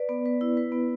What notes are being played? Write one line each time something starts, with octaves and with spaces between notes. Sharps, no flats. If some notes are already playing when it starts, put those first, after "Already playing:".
Already playing: B4 D5
B3
B4
E4
B4
B3